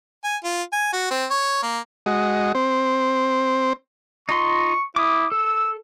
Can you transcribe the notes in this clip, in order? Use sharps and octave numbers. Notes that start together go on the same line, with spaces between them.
G#5
F4
G#5
F#4
C4
C#5
A#3
G#3 F#4 D#5
C4 C5
D#4 F4 C6 C#6
E4 D6 D#6
A4 E6